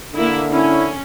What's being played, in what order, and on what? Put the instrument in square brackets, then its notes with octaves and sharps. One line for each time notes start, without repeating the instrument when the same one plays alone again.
[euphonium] D3 [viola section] A#3 E4
[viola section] C#4 [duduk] E4